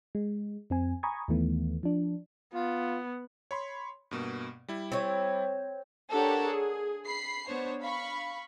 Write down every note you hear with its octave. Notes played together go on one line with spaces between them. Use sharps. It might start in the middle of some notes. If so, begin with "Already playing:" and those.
G#3
F2 C4 G#5
G#5 A#5 B5 C#6 D#6 G#6
D#2 D#3 E3 A3 B3
F3 D4
B3 F4
C#5 B5 C6
G2 B2 A#3
G3 E4
C4 C#5
D4 G4 A4 A#4 C#5 F#5
G#4
B5 C7
B3 D4 C5 C#5
F5 B5 C#6